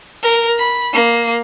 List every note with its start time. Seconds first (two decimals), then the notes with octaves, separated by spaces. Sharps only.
0.23 A#4
0.58 B5
0.93 A#3